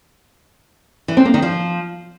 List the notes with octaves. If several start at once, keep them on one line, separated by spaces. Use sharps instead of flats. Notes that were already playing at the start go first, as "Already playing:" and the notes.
E3
C4
A#3
D#3
F3